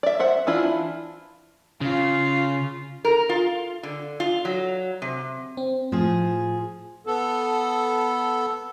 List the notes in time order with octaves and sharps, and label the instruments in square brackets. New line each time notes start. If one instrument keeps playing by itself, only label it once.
[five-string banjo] D5 E5
C5 E5 F#5
E3 D4 E4 F4
[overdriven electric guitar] C#3 [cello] F4
[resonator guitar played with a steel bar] A#4
F4
D3
F4
F#3
C3
[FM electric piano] C4
[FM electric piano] A2 [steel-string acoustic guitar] F3 G#4
[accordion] B3 A4